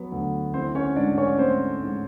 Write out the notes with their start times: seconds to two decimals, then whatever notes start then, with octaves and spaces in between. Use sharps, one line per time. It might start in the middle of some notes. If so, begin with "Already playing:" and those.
Already playing: F#3 B3
0.12 D2
0.54 E3 C4 C5
0.75 C#4 C#5
0.96 G#2 D4 D5
1.18 C#4 C#5
1.39 A3 C4 C5
1.82 G#2